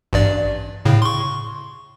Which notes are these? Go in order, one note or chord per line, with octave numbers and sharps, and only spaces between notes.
A1 G2 D5
A2 C#3
C6 C#6